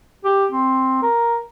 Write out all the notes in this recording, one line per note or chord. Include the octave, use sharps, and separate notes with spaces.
G4
C4
A#4